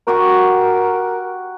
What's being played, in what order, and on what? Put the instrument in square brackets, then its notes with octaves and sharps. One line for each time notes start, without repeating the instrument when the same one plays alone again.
[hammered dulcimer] F#4 G4 C#6 [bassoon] A#4